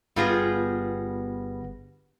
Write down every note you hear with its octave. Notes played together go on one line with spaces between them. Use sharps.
G1 G3 B3 F4 G#4 A#6